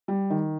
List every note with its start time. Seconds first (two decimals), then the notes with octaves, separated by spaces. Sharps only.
0.08 G3
0.30 D#3